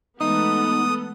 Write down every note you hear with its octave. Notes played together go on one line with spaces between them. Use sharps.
E3 G#3 A3 B3 D#4 A4 D#6